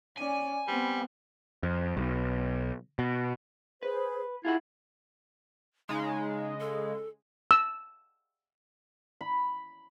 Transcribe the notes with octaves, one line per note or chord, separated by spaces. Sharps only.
C#4 D5 G#5
G3 B3 C4
F2
B1
B2
G#4 B4 C5
E4 F4 G#4 F#5 G#6
C#3 G#3 D#4
A4
E6
B5